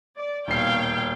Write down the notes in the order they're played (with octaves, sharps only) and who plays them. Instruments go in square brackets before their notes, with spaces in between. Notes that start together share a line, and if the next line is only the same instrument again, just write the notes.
[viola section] D5
[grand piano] D#1 C7 [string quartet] B2 G5 [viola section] C#5 F5